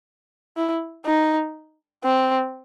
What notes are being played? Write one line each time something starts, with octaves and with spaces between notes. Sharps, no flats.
E4
D#4
C4